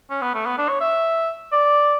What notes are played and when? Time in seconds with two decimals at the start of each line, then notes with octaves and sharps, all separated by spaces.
0.10 C#4
0.22 B3
0.34 A3
0.46 B3
0.58 D4
0.69 C#5
0.81 E5
1.52 D5